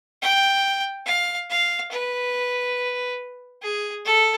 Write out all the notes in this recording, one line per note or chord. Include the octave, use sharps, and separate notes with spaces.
G5
F5
F5
B4
G#4
A4